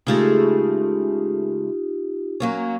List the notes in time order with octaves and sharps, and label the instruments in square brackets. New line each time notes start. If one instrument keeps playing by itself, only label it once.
[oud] C#3 G#3 A3 [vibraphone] D#4 F4 G4
[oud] F#3 A#3 C#4